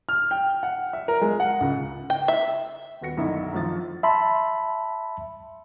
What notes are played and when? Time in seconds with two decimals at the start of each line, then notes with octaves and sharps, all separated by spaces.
0.09 F6
0.31 G5
0.63 F#5
0.93 E5
1.08 A#4
1.21 G#3
1.40 F#5
1.61 C#2
2.10 G5
2.28 E5
3.01 D#1 B3 F#4 A#6 C#7
3.17 B1 F#2 D3 D#3 E4
3.53 G#1 F#2 F3 A6
4.03 E5 A5 B5 C6